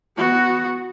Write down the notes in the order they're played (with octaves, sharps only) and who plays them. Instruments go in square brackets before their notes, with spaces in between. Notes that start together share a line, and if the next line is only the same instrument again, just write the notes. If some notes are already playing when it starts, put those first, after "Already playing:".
[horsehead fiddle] B3 F#4